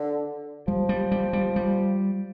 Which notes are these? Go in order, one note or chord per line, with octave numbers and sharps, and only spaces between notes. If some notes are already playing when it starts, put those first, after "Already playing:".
Already playing: D3
F3 G3
G3
G3
G3
G3